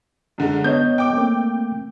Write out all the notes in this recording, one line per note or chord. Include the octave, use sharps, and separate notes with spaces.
F#2 D3 G#3
B3 C#5 D#5 G6
G5 D6
A3 A#3 C4